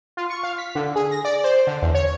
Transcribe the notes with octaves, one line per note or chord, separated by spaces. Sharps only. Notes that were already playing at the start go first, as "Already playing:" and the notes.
F4
C#6
F5
B6
D3
G#4
A#6
D5
C5
D3
E2
C#5